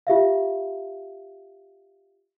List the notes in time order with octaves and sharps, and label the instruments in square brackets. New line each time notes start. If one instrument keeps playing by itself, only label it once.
[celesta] F4 G4 E5 F5